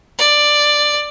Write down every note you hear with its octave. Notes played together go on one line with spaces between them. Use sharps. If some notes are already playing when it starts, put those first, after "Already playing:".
D5